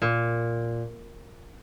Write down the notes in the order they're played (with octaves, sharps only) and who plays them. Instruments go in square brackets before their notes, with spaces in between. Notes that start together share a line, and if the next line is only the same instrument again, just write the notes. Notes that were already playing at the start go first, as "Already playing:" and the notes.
[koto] A#2